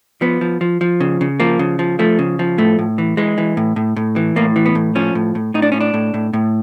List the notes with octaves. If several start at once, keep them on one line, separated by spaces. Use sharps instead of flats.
F3 B3
F3
F3
F3
C#3
C#3
F3 A#3
C#3
F3
F3 A3
C#3
F3
A2 A3
A2
E3
E3 G#3
E3
A2
A2
A2
E3
A2 A#3
E3
B3
A2
F3 C#4
A2
A2
A2 D#4
D4
A2 C#4
D4
A2
A2
A2